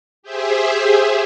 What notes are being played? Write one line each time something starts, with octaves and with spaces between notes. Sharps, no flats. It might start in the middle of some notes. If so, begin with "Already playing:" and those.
G4 G#4 C5 E5